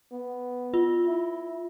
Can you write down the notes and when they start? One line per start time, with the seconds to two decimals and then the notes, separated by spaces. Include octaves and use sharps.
0.12 B3
0.74 F4
1.07 E4